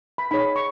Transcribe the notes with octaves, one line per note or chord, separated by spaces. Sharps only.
B5
D#4 G#4 C#5 B5
C#6